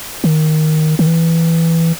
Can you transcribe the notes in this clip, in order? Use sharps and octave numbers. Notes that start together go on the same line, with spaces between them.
D#3
D#3
E3